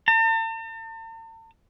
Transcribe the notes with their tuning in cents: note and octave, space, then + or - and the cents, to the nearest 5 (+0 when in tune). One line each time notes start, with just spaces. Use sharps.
A5 +45